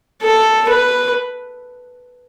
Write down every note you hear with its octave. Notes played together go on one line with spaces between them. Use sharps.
A4
B4